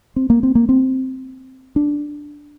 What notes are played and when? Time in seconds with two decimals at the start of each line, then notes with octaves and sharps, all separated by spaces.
0.16 C4
0.30 A#3
0.43 C4
0.55 A#3
0.69 C4
1.76 D4